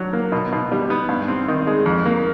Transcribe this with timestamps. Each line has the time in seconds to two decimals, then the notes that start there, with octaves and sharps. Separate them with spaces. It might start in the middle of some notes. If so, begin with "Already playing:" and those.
Already playing: F#3 D4
0.13 A#3
0.32 B2
0.52 B2
0.72 G3
0.90 B3
1.09 G2
1.28 C4
1.48 D#3
1.67 G#3
1.86 F2
2.06 A#3